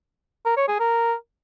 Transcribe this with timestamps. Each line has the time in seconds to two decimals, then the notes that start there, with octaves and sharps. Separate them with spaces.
0.46 A#4
0.57 C#5
0.68 G#4
0.80 A#4